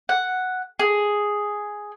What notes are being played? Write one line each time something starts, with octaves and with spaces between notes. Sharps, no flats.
F#5
G#4